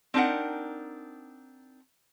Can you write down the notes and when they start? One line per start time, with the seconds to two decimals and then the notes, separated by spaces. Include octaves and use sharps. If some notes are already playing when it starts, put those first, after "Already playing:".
0.14 C4 D4 D#4 A#4 F#5